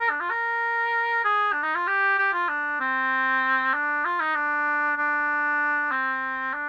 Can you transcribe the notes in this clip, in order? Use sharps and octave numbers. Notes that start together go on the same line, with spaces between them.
A#4
D4
F4
A#4
G#4
D4
D#4
F4
G4
G4
F4
D4
C4
D4
F4
D#4
D4
D4
C4
D4